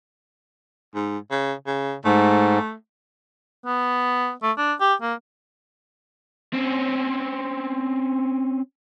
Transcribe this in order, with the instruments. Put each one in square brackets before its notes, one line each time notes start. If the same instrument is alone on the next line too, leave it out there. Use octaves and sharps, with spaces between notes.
[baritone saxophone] G#2
C#3
C#3
[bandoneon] G#2 [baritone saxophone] A3
[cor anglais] B3
A3
D4
G4
A#3
[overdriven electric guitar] C4 C#4